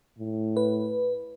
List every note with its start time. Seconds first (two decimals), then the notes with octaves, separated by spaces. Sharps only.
0.19 A2
0.57 B4